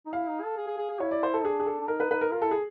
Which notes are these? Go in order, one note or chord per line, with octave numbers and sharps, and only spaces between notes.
D#4
E4 F5
D#4
A4
G#4
G#4
G#4
G#4
E4 C#5
D5
C5
A4
D4 G#4
G#4
A4
D4
D#4 A#4
B4
D#4 B4
A#4
F4 A#4
E4 A4
G#4